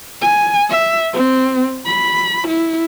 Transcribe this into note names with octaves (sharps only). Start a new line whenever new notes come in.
G#5
E5
C4
B5
E4